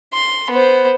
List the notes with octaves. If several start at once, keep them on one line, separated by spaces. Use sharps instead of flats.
C6
B3 C5